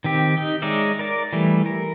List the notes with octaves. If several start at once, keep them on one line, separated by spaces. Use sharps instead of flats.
D#3 C4 G4
D#4
G#3 D#4 C#5 D5 E5
A#4 D5
E3 G3 A3
A#4